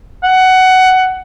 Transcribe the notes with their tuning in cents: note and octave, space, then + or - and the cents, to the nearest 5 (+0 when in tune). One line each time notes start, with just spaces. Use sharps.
F#5 +15